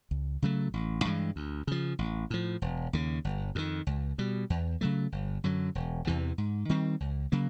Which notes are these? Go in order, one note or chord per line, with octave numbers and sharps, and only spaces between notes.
C#2
C#3 F#3 A3
A1
G2 E3 G#3
D2
C#3 F3
A1
A2 F3
E1
D#2 C#3
G1
F2 C3 D#3
C#2
B2 G3
E2
C#3 F#3 A3
G1
F#2 D3 F#3
E1
E2 C3 E3
G#2
D#3 G3 C4
C#2
C#3 F#3 A#3